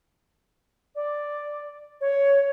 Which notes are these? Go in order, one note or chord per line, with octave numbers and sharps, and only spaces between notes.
D5
C#5